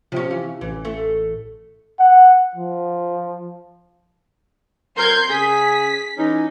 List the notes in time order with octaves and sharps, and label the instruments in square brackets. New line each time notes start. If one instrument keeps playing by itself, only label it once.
[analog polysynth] C3 [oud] F3 C#4
[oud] E3 F5
[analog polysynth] A1 [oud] E3
[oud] A3
[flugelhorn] F#5
F3
[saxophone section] F#3 C4 A#4 [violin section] C6 G6 G#6
[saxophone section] C#3 G#4 [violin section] B6
[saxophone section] E3 C#4 D#4